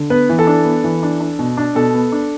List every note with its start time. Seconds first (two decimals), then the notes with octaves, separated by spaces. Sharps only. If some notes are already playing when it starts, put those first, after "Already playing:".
Already playing: D3
0.10 B3 B4
0.29 E3
0.39 A4
0.47 D4
0.65 B3
0.84 E3
1.03 D4
1.20 D4
1.39 B2
1.57 D4
1.75 B2 A4
1.94 B3
2.12 D4